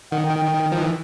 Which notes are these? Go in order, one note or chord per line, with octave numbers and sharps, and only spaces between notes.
D#3 F#5
G5
G5
F3
E3